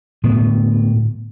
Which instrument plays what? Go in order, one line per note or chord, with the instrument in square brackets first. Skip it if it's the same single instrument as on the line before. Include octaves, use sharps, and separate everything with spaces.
[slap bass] A2 D3 B3